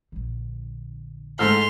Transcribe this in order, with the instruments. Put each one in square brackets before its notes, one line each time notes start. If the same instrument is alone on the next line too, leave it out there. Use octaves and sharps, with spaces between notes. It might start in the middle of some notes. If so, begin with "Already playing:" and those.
[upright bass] A#1 D3
[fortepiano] G#2 A4 F6 [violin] C6 F7